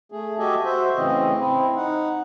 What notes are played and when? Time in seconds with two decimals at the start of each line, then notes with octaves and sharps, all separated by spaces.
0.12 A3 G#4
0.39 F#4 G4 A4 D#5 E5 G#5
0.65 F#4 C5 E5
0.96 A2 C#3 E3 C4 D#5
1.39 C4 E4
1.77 D#4 F#5